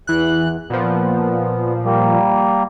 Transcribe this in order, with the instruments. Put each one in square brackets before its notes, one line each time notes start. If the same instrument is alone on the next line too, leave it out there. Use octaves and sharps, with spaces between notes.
[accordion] E2 [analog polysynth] E3 F#6
[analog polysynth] A#2 F3 [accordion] B3
[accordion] G3 A#3